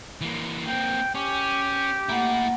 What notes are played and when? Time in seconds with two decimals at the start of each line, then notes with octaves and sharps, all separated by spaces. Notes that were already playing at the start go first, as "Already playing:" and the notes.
0.21 E3 A#3
0.67 A#3 C4 G5
1.15 C#4 G4
2.09 A3 A#3 E4 F#5